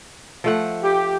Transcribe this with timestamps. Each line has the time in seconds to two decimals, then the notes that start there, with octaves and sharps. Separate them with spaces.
0.44 F3 A3 F#5
0.83 G4